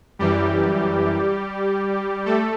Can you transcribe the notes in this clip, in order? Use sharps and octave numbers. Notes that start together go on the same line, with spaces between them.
F#2 E3 G3 G4
A3 A4